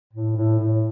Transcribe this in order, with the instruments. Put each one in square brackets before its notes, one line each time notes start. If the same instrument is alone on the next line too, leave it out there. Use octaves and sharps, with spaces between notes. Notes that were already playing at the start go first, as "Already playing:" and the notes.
[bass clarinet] A2
A2
A2